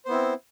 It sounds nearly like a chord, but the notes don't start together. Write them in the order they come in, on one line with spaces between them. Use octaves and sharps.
C5 B3 E4 C4